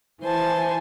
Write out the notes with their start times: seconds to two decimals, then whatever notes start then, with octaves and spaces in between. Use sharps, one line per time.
0.22 E3 C5 G#5 A5